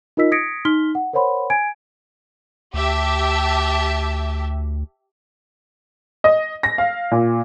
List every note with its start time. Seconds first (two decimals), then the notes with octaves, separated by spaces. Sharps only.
0.17 D#4 F4 A#4 D#5 E6 B6
0.32 D#6 G#6 A#6 B6 C#7 D7
0.65 D#4 C6 F6 B6 G7
0.95 F#5
1.13 A#4 C5 C#5 F#5 B5 C6
1.50 G#5 G#6 D7
2.74 D2 G4 E5 A5
6.24 D#5
6.63 A#6
6.78 F5
7.11 A#2